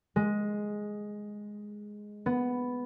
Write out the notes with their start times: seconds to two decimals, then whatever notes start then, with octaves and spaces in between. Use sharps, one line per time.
0.16 G#3
2.26 B3